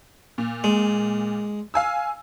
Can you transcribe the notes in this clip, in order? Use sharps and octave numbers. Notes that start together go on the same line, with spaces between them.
A#2
G#3
F5 G#5 E6